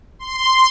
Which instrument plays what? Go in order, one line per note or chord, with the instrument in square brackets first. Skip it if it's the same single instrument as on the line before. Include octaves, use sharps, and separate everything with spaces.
[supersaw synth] C6